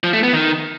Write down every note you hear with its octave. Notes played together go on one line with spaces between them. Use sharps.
F3
A3
B3
D#3